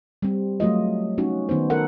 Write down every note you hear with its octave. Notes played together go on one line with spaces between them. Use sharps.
G3 C4
F#3 A3 F4 D#5
C#4 D#4 F#4
D#3 B3 D#4 C5
A4 A#4 F#5